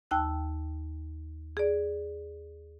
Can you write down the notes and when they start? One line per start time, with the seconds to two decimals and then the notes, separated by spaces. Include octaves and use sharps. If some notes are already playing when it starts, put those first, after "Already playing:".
0.11 D#2 G5 A5 E6 F#6
1.57 G#4 D5